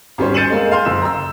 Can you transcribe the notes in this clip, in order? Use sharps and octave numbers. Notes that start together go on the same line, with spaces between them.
G#1 G3 C#4 C5
G6 A6 C#7 D#7 E7 F#7
G#3 A#3
F5 C6 G6
F#1 E6 E7
A#5 E6